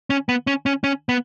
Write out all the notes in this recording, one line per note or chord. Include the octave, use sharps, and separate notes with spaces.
C#4
B3
C#4
C#4
C#4
B3